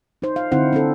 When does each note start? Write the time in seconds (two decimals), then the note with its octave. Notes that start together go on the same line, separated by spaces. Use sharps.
0.22 D#4 C5
0.36 F5
0.52 D3 C4 D#4 E4 C5 F#5
0.73 C4 D4 A4